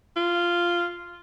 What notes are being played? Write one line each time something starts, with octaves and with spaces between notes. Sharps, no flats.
F4